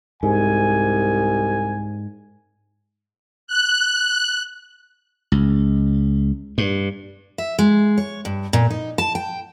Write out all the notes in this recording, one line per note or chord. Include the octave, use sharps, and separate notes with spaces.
C2 G#2 G#5
F#6
C#2
G2
E5
G#3
C#5
G2
A#2
D#4
A5
G5